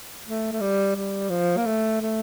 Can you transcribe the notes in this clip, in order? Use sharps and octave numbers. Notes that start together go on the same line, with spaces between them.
A3
A3
G3
G3
F3
A#3
A3
A3